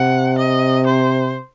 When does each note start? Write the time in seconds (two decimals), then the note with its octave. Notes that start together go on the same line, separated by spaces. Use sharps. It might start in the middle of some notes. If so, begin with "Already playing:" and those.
Already playing: C3 F#5
0.39 D#5
0.87 C5